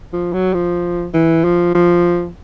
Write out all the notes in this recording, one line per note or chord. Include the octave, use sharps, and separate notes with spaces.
F3
F#3
F3
E3
F3
F3